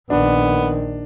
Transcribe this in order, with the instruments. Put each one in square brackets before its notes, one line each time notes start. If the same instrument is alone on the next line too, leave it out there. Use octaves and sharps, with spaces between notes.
[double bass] A#1 D#3 [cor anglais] B3 [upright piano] D4